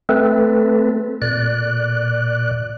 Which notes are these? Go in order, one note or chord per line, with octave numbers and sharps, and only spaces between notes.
A3 C4 A4 B4
A#2 D5 F#6